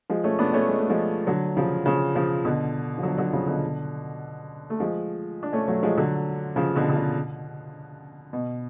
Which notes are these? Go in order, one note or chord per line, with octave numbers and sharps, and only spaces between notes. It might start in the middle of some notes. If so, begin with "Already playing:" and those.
F3 G#3
A3 C#4
B3 D4
A3 C#4
G#3
A3
F3 G#3
D3 F#3
C#3 F3
C#3 F3
C#3 F3
B2 D3
F3
D3 F#3
D3 F#3
C#3 F3
B2 D3
A3
F3 G#3
D4
A3 C#4
F#3 A3
F3 G#3
D3 F#3
C#3 F3
B2 D3
D3
C#3
B2